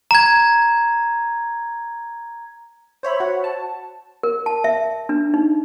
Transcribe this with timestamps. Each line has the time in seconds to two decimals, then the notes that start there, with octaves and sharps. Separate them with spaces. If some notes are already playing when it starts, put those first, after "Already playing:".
0.11 A#5 G#6
3.03 C5 C#5 E5 B5
3.20 F#4 F#5
3.44 A5
4.23 A#4
4.46 A5
4.64 E5
5.09 D4
5.34 D#4